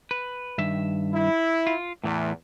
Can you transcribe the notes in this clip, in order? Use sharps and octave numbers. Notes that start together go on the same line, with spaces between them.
B4
G2 D#3 E5
E4
F4
E2 A2 E3